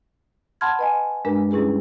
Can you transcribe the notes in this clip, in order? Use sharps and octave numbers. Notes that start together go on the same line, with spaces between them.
F#5 A5 B5 C6 F6 G#6
B4 D#5 G#5
G2 G#3 D4 A#4 B4
G3 C#4 E4 G#4 B4